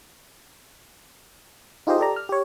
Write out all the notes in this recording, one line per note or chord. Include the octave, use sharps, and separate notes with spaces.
D#4 F4 G4 G#4 C5 D#5
G4 A4 D5 A#5
F6
G4 C#5